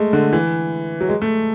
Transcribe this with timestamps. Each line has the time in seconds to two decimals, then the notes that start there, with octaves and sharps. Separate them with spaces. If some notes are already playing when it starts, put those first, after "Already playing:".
Already playing: G#3 A3
0.13 D3
0.33 E3
1.01 F#3
1.09 G#3
1.22 A3